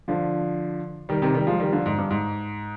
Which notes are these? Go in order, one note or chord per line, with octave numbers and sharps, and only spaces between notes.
D3 F3
D#3 G3
C3 D#3
D#3 G3
F3 G#3
D#3 G3
D3 F3
G#2
G2
G#2